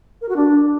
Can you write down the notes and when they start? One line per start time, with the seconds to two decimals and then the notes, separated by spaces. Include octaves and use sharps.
0.21 A#4
0.29 F#4
0.36 D4